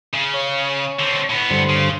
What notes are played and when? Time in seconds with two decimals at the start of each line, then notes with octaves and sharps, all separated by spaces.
0.14 C#3
0.34 C#5
1.00 D3 C4
1.30 A2 B3
1.50 G2 D3 C5
1.70 C#3